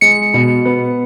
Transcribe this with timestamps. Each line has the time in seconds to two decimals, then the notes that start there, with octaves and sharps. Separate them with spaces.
0.01 G#3 C#7
0.34 B2
0.65 B3